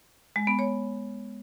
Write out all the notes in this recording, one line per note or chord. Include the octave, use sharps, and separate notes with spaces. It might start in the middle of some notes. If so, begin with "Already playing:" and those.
G#3
B3
C#5